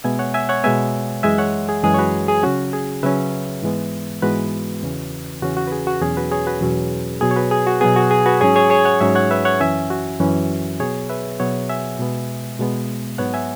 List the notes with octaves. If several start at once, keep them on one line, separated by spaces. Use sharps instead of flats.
B2 G#3 B3 E5 G#5
C#5 F#5
E5 G#5
C#5 F#5
B2 G#3 B3 E5 G#5
F#2 E3 G#3 E5 G#5
C#5 F#5
G#4
F#2 E3 G#3 G#4
C#5
F#4 B4
G#4
C#3 F#3 C#4 F#4
G#4
C#3 F#3 C#4 B4 E5
G#2 E3 G#3 B3
G#2 E3 G#3 B3 F#4 B4
E2 C#3 E3 C#4
E2 C#3 E3 C#4 F#4
F#4
B4
G#4
F#4
E2 B2 F#3 C#4 G#4
F#4 B4
G#4 C#5
F#4 B4
E2 B2 F#3 C#4
B2 F#3 B3 G#4
C#5
F#4 B4
G#4
F#4
B2 F#3 B3 G#4
F#4
G#4
F#4 B4
G#2 F#3 C#4 G#4 C#5
G#4 C#5
G#4 C#5
C#5 F#5
G#2 F#3 C#4 E5 G#5
C#5 F#5
B4 E5
C#5 F#5
F#2 E3 C#4 E5 G#5
F#4
F#2 E3 C#4
B2 F#3 B3 G#4 C#5
B4 E5
B2 F#3 B3 C#5 F#5
E5 G#5
B2 G#3 B3
B2 G#3 B3
G#2 F#3 B3 C#5 F#5
E5 G#5